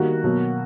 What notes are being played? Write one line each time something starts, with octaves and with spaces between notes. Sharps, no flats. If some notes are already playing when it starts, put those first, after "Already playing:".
Already playing: D#3 G3 A#3 F#4
B2 F#3 A#3